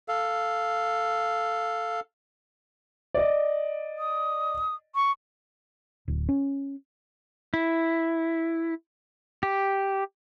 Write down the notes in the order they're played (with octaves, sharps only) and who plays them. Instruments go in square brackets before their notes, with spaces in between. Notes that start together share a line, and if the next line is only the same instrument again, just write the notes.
[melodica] A4 F5
[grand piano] D5 D#5
[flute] D#6
C#6
[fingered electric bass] D1
C#4
[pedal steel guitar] E4
G4